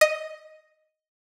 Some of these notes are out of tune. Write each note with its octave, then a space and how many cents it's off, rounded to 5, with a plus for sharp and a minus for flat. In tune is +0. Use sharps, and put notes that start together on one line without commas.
D#5 +0